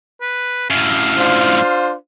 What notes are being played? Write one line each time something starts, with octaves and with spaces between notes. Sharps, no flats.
B4
F#2 A2 F5
D4 F4 C5